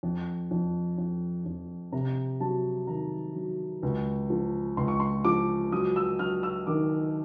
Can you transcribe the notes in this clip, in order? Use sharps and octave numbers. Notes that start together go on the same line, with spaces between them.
F2
F2
F2
F2
C3 A#5
F#3 A5
D#3 A#5
F#3
C#2
F3
C#2 C6
C#6
C6
F3 D6
F#3 D#6
E6
F#3 F6
E6
D#3 D6